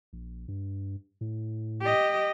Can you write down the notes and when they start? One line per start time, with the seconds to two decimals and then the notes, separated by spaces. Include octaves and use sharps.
0.13 A#1
0.48 G2
1.21 A2
1.82 G4 D#5